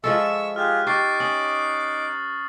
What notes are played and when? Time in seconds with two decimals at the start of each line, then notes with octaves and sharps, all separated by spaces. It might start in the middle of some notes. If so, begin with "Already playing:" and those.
0.04 F3 G#3 A4 E5 C#6 E6
0.56 F4 G4 G#4 F6 F#6
0.87 D#4 G4 C#6 D6 A6 C7
1.20 C#4 D#6 F#7